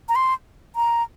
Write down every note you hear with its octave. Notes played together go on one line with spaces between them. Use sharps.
A#5
C6
A#5